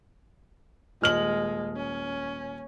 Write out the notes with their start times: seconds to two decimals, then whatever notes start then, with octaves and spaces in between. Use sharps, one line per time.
1.02 D#1 G#3 F6 F#7
1.76 C#4